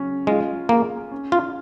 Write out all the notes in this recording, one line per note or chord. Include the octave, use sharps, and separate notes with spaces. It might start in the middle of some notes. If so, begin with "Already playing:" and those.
Already playing: C#3 F#3 C#4
G#3 F4
A#3 G#4
C#4
F4